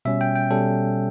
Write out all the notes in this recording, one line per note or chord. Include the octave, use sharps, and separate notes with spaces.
B2 G3 C#4 E5
G5
G5
B2 G3 C#4 A4